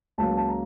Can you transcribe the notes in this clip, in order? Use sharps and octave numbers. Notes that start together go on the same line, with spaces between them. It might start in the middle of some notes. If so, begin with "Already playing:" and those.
C#2 C#3 F#3 A#3 A5
A5
A#5